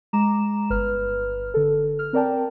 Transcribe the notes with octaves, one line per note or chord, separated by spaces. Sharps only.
G#3 A#5 D6 E7
G1 B4 F6
D3 A4
F6
C4 A#4 D5 G5 A5